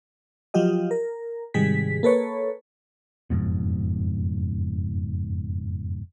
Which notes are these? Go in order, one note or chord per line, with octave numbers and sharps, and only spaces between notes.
F3 F#3 F4 G4 D#5
A#4
G#2 C3 D#3 G3 G#4 B6
A#3 A4 B4 C#5
F#1 F2 G#2 B2